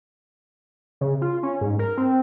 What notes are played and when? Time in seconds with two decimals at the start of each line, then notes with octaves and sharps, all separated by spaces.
1.01 C#3
1.22 F4
1.43 C#4
1.61 G#2
1.79 A#4
1.98 C4